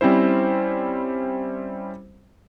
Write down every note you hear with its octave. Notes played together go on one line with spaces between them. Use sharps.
G3 C4 C#4 E4 C5